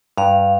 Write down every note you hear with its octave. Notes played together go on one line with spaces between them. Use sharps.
G2 F5